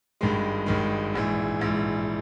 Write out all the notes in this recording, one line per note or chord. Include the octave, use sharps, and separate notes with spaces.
G#1 G2 D#3 G#3
G#1 G2 D#3 G#3
A#1 G#2 E3
A#1 G#2 E3